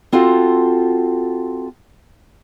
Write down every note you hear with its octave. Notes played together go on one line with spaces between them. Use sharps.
C4 F4 F#4 A4